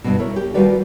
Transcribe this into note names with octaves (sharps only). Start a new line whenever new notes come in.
G2 B2
E4 A#4 C#5
G4
D#2 G3 F4 F#4 B4 D5